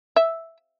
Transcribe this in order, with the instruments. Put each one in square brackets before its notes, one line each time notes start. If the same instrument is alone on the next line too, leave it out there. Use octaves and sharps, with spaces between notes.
[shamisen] E5